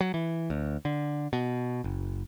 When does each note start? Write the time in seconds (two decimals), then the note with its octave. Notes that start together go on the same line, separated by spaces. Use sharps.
0.01 F#3
0.14 E3
0.50 D2
0.85 D3
1.33 B2
1.84 F#1